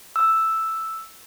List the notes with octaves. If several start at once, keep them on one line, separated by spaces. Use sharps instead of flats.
E6